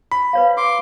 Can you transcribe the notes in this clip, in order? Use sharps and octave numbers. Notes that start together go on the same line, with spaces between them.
B5
B4 C#5 F5
C6 D6